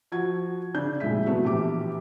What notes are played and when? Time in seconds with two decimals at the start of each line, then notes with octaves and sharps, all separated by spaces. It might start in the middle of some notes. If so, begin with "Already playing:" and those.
0.12 F3 F#4 G#6
0.74 C#3 D4 G6
1.00 D#1 C2 F2 G#3 E5 B6
1.26 F#3 A3 B3
1.45 A#1 E3 G4 D6